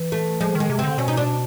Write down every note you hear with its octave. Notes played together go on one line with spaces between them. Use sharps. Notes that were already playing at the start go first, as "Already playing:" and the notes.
Already playing: E3
A3
F3 G#3
D#3
G#3
C3
D3 C4
B2 C#4
D#4
D4